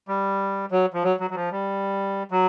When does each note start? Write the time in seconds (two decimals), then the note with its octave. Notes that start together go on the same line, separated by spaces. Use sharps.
0.08 G3
0.72 F#3
0.94 F3
1.04 F#3
1.20 F#3
1.31 F#3
1.35 F3
1.51 G3
2.31 F#3